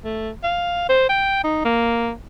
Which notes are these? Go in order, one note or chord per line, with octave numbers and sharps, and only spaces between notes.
A3
F5
C5
G5
D#4
A#3